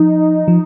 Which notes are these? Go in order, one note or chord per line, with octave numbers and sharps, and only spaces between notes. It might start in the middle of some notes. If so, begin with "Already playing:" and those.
Already playing: F3 D#4
F3